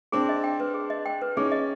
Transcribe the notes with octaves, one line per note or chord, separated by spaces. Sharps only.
C4 D4 G#4
D#5
G5
B4
G#4
D#5
G5
B4
C#4 D#4 G#4
D#5